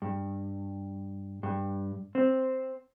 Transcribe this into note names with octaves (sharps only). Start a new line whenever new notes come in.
G2
G2
C4